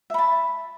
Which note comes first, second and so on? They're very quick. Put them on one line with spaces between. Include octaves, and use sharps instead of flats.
E5 B5 A5